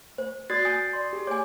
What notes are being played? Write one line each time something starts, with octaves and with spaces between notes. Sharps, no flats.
C5
F#4 D5 D#6 F#6 A6 C7
G#5 D#6 G6 A6
D5 C6
G4 G#4
C#5 G#5 D6